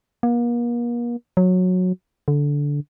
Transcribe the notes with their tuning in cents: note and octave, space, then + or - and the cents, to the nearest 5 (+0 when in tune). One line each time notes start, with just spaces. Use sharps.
A#3 +40
F#3 -15
D3 -15